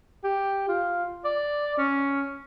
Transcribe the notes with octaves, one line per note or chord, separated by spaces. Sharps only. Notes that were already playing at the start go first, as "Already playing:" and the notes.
G4
F4
D5
C#4